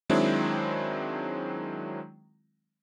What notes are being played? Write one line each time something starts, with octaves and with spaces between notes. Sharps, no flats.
D#3 F#3 G#3 C4 D4 E4